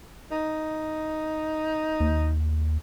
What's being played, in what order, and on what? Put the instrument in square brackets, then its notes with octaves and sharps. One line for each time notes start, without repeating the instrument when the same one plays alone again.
[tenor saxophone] D#4
[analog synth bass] D#2